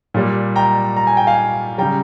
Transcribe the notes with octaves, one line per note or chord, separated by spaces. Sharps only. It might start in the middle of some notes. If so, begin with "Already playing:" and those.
A#2 G3
G5 A#5
A#5
G#5
G5
F5 G#5
C#3 G3 G5 A#5